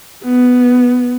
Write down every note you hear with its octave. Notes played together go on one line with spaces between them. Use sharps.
B3